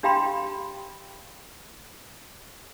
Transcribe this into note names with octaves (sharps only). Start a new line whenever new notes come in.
D4 G4 F5 G5 B5 C6